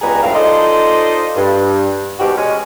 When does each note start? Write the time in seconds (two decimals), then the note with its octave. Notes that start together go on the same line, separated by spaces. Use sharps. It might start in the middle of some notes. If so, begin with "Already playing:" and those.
0.02 C#2 G3 B3 G#4 A#5
0.23 G2 A#2 F#3 C4 E4 F5
0.35 D#4 F4 A4 C5 D5 D#5
1.36 G2
2.19 G#2 B2 G3 F#4 G4
2.37 G#3 C#4